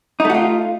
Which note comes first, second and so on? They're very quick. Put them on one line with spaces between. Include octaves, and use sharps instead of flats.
D#4 A3 F#4 F4